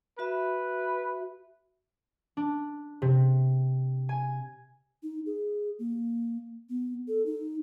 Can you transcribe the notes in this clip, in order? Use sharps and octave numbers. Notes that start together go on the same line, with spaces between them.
F#4 B4 E5
D4
C3
G#5
D#4
G#4
A#3
B3
A4
D#4